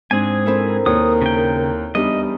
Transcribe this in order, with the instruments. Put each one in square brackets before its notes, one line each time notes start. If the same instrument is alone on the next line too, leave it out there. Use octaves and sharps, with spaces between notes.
[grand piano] G#2 [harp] C4 D4 [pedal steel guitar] G#4 G#5
[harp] C4 E4 A4 [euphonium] A#4
[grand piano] D#2 [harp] C#5 [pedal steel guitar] D#6
[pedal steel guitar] C#3 G5
[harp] E2 D4 D#4 [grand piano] G3 [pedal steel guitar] D#5